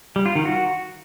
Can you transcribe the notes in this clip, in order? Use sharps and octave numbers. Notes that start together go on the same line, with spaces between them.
G3
F4
D#3
F#4